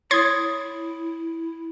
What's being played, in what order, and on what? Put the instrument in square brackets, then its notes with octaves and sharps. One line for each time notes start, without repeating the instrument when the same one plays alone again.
[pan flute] E4 [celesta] C#5 D#6 [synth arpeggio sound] C6 G#6 A6